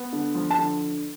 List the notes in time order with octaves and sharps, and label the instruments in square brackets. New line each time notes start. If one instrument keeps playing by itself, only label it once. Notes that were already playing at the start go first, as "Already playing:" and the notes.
Already playing: [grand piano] B3
D3
F3
A5
D3